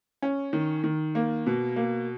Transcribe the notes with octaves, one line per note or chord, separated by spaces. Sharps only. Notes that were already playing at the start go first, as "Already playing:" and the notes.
C#4
D#3
D#3
A#3
B2
A#3